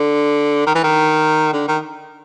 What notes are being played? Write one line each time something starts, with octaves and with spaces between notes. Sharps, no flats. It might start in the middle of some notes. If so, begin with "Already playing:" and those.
Already playing: D3
D#3
E3
D#3
D3
D#3